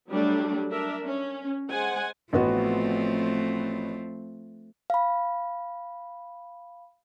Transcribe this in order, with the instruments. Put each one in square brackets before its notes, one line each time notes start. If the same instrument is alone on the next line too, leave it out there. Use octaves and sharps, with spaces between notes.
[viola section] F#3 G3 A3 D4
D4 A#4 E5
C#4
G#3 C5 F#5 G#5
[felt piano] A1 B3 F#4 [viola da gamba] F3 A3 C4
[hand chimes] F5 B5